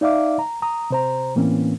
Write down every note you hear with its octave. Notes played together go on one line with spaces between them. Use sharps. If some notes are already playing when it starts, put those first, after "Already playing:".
D#4 D5 E5 F5 D6
A#5
A#5 D#6
C3 C5 A#5
A2 E3 A#3 C4 C#4